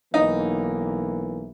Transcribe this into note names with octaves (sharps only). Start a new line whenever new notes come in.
B1 E3 A#3 D#4